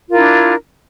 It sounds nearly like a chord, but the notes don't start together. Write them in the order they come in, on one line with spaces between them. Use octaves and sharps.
F4 A#4 E4 D4